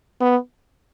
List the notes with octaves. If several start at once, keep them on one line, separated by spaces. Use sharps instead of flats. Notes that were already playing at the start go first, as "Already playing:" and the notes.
B3